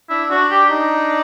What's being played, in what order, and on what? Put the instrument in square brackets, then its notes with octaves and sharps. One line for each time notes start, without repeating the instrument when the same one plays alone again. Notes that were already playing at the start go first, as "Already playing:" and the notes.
[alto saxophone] D4 [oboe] E4
[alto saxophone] D4 [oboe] F#4
[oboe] G4
D#4